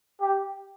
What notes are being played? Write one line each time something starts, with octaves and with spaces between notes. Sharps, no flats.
G4